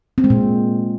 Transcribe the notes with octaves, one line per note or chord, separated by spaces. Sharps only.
C4
G#3
A#2